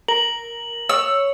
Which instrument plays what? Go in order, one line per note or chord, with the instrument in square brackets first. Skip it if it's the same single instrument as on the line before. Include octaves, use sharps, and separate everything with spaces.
[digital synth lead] A#4 [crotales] F#7
[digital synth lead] C#5 [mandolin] E6